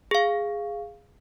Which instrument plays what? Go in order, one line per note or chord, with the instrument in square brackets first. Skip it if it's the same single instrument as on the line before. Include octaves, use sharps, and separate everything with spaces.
[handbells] G#4 F5